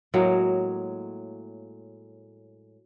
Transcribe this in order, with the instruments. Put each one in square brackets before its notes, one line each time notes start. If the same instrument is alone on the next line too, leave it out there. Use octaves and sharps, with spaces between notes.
[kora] A2 F#3 G#3 A#3